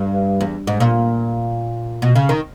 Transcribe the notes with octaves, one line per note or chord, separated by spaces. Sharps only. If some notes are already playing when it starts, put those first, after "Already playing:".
Already playing: G2
E2
G#2
A#2
B2
C#3
D#3